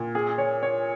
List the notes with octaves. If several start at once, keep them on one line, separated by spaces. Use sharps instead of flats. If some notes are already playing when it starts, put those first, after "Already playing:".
Already playing: A#2
G#4
C#5
C#5